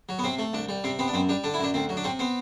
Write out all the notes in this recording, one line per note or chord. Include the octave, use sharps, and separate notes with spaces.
F#3
B3
C3 C4
A3
C2 D4
G3
C3 C4
B3 C4
D4
F#2 C4
G3 D4
D3 D4
E4
F#2 D4
D2 C4
F#3
D4
C3 C4
B3 C4